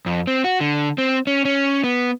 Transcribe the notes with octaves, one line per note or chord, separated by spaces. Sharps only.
F2
C4
F#4
D3
C4
C#4
C#4
B3